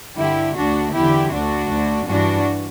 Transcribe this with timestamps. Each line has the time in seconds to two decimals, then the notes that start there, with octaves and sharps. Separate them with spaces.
0.18 G2 D3 E4 G4
0.56 D2 D3 D4 F#4
0.93 E2 D3 E4 G4
1.31 D2 D3 D4 F#4
1.69 D2 D3
2.06 G2 E3 D4 F#4